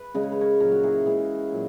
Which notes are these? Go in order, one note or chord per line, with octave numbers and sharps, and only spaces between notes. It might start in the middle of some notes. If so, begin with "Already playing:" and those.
Already playing: B4
C#3 G#3 D#5
C#5
B4
A#4 C#5
A#2 F#3 A#4 C#5
F#4 A#4
E4 G#4
C#3 E3 G#3
A#2 F#3